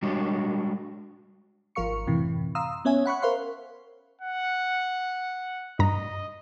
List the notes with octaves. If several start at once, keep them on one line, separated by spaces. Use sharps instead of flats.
G3 G#3 D4 F#4 C#5 D#5
G#1 F3 A#4 F5 C#6 C#7
F#2 A2 C3 E3
F5 A#5 C6 D#6 E6
B3 C#4 C#5 E5 G#5
F#5 B5 C#6 F#6
A#4 C5 E5 F5 C6
F#5
G2 D#5 A#5